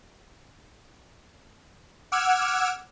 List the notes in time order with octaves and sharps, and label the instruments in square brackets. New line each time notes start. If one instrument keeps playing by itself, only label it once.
[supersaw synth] F#5 D6 E6 F6 G#6